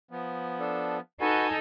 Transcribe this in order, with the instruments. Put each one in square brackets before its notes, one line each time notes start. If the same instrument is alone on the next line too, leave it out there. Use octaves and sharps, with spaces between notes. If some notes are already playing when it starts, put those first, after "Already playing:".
[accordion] F3 B3
[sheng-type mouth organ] D4 A4
[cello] D#4 A4 [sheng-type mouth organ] F#4 B4 [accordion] G#5